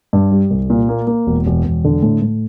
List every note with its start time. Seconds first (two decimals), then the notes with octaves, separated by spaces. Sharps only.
0.13 G2
0.31 G3
0.50 C2
0.70 A#2
0.89 A#3
1.07 A#3
1.27 E1
1.46 E1
1.65 E1
1.84 D3
2.03 A2
2.22 A2